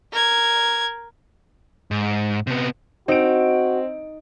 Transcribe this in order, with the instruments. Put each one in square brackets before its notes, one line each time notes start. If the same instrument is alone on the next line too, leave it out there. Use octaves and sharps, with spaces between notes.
[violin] A#4 G#6
[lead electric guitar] G#2
C3 B3
[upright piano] C4 D7 [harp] D#4 [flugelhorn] F#4